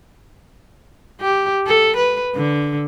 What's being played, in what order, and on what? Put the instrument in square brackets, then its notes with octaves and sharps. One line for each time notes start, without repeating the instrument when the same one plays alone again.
[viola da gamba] G4
A4
B4
D3